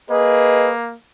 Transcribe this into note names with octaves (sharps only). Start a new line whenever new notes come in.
A#3 G#4 B4 D#5